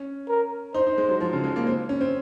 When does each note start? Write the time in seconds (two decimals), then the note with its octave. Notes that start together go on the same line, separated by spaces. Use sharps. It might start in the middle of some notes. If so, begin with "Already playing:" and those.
Already playing: C#4
0.29 A#4
0.74 D#4 C5
0.87 D#4
0.98 G#3
1.09 F#3
1.20 F3
1.33 C#3
1.44 G#3
1.56 A#3
1.67 C4
1.89 C#4
2.01 C4